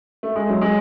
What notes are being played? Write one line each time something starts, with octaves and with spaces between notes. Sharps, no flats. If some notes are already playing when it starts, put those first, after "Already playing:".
A3
G#3
F#3
G#3